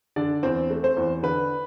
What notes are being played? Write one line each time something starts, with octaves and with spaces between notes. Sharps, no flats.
D3 D4 D5
E2 C4 C5
A3
C4 C5
E2
D3 B4